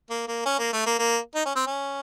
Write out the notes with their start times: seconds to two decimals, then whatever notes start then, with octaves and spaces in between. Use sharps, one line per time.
0.10 A#3
0.28 A#3
0.46 C#4
0.59 A#3
0.73 A3
0.86 A#3
0.99 A#3
1.35 D#4
1.46 C#4
1.56 C4
1.67 C#4